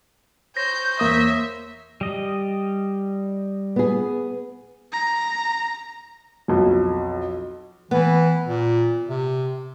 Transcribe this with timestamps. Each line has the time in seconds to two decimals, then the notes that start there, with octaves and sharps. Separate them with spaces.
0.57 C5 C#5 G6 A#6
0.99 E2 A#3 E5 D#6
2.01 G3 D#5
3.76 B3 G#4
4.92 A#5
6.48 B1 F2
7.91 E3 B3
8.47 A#2
9.08 C3